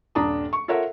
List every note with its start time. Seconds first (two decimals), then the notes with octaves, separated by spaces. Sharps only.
0.15 D#1 G2 D4 A5 A#5 D#6
0.53 C#6
0.68 F4 A4 A#4 C#5 E5 F#5